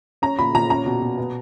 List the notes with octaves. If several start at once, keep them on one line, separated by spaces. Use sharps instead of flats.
C#4 A#5
A#2 B5
A#2 A#5
C#4 A#5
B2
B2
B3